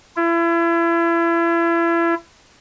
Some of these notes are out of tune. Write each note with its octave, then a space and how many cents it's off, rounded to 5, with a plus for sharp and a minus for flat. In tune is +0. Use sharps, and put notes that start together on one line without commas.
E4 +35